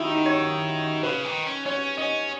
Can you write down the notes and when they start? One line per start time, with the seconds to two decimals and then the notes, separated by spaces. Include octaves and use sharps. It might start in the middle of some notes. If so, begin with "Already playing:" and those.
Already playing: D#3 E4 F#4
0.10 D#4
0.26 C#5
1.03 C#3 B4
1.24 D#3
1.46 C#4
1.66 C#4 C#5
1.97 C#4 D#5